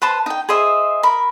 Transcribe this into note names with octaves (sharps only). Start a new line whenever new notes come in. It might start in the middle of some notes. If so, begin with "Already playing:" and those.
B4 C5 A5 C6
D#4 G5
G#4 C5 D#5 E5
A#4 B5